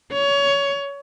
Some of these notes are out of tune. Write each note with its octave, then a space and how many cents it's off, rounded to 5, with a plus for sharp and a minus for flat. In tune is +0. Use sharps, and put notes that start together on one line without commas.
C#5 +20